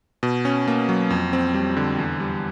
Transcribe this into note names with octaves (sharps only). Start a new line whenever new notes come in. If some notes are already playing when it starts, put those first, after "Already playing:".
B2
C#4
A#3
F#3
F2
C4
G3
D3
E2
G3